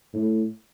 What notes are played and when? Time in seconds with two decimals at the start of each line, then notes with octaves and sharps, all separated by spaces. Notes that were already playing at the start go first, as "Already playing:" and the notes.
0.14 A2